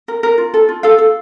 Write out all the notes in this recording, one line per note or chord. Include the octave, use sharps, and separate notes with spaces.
A#4
A#4
F4
A4
F4
A4 F5
A4